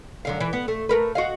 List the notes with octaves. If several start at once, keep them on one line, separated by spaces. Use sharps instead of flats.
F#2 D3 F5
E3
B3
A3
A3 A#4 B4
F#4 D#5 F5